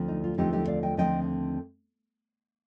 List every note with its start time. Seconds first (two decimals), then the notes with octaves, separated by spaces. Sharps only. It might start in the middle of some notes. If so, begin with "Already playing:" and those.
Already playing: D2 D3 F3 C4
0.08 D#4
0.24 F4
0.38 D#2 D3 F3 A3 C4 D#4 G4
0.53 D#4 G4
0.68 D5 F5
0.82 D#5 G5
0.97 D#2 D3 F3 A3 C4 D#5 G5